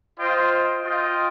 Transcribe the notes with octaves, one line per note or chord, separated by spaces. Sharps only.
F4 C5 D#5 G5
F4 D#5 G5